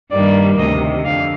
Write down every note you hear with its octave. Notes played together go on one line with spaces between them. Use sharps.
G2 D#3 G3 A#3 D5
D2 C3 D#3 D#5
F2 D3 F5